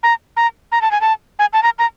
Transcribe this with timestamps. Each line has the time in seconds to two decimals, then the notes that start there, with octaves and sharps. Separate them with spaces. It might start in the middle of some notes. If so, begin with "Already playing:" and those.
0.03 A#5
0.37 A#5
0.72 A#5
0.82 A5
0.91 G#5
1.01 A5
1.39 G#5
1.53 A5
1.63 A#5
1.79 A#5